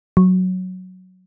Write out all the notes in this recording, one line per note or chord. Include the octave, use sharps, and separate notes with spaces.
F#3